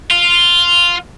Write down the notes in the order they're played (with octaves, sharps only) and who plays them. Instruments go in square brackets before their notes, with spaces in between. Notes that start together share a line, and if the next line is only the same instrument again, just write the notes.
[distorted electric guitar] F4